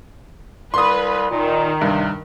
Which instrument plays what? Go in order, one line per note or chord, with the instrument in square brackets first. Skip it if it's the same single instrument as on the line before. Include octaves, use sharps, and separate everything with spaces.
[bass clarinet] C2 [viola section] B4 [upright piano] C6 D#6
[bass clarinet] A#2 [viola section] D#3
[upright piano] G2 [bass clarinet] C3